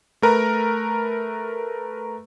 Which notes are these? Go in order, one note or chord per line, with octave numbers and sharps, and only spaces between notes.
A3 A#4 B4 A#5